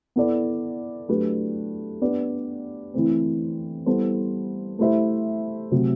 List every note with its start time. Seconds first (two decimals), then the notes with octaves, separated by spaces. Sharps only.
0.16 B3 E4 A4 D5
1.09 F#3 A3 D4 G4 B4
2.01 B3 D4 G4 B4 D5
2.94 E3 A3 C4
3.86 G3 B3 E4 A4 C5
4.79 A3 E4 G4 C5 E5
5.71 C3 F#3 A3